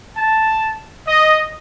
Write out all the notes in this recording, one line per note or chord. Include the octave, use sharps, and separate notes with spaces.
A5
D#5